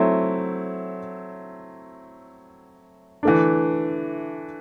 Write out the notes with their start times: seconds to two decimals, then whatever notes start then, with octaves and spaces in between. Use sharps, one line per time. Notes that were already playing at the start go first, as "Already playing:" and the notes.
Already playing: F#3 A3 C4 E4
3.23 E3 A3 D4